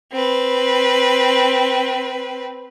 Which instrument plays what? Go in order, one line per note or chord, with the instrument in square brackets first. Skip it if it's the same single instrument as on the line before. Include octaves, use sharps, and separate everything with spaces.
[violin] C4 B4